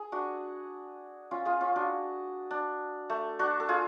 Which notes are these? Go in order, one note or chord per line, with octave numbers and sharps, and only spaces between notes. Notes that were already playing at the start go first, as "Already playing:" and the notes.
Already playing: G#4
D4 F#4
C#4 F4
F4 G#4
C#4 F4
D4 F#4
D4
A3
D4 F#4
A4
F4 G#4